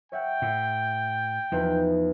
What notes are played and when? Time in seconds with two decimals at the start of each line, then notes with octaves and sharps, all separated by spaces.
0.12 C#5 E5 F#5 G5
0.42 A2
1.52 E2 F3 D#4 B4